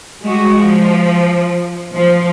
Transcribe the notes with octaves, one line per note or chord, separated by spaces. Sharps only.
G3 G#3 F#4
F3
F3